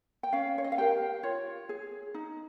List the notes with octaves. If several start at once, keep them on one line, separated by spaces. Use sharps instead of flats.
G5
C#4 F5
C#5
D#5
F5
G4 A#4 G5
F4 C#5
G#4
D#4